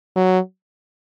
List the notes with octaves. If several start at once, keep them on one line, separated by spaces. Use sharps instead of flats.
F#3